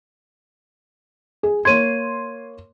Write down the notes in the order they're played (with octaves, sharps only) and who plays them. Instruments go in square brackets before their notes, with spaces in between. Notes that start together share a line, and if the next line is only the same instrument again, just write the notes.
[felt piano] G#4
[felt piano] A#3 C#5 C6 [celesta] G#6 D#7